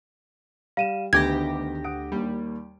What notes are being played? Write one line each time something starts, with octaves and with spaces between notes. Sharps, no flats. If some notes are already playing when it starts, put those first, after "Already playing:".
G3 F5 D#7 E7
D2 D#3 A3 B3 D4 G4 G#6 A#6
F#5 D#6 D7
D#2 G3 A#3